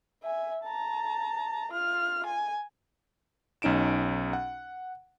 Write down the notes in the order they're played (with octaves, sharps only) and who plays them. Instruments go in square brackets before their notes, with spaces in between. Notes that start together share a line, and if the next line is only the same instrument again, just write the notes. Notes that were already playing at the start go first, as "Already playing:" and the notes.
[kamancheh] E5 G#5
A5 A#5
F4 F6
G#5
[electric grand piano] B1 C#4 D#4 D7 E7
F#5